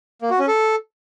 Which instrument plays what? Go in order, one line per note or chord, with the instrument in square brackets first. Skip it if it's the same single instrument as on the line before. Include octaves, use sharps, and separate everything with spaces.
[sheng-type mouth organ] A#3
F#4
C#4
A4